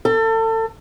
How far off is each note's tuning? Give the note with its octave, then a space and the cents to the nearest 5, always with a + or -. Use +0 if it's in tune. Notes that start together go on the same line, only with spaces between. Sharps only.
A4 +30